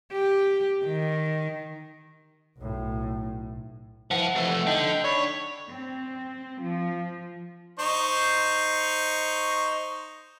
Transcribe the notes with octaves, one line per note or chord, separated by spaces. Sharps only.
G4
D#3
B1 A2
E3 F3 F#5
F2 A3
D3 D#4 G5
D4 C#5 B5
C4
F3
D#4 C5 C#6